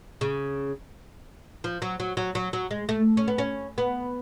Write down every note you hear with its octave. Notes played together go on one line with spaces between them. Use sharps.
C#3
F3
F#3
F#3
F#3
F#3
F#3
G#3
A3
C#4
B3
C#4
B3